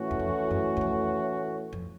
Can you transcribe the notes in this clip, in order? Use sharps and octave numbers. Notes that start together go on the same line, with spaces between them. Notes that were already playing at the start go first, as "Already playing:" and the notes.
Already playing: A2 E3 A3 C#4 F#4
E2
F2
F#2
E2
F2
F2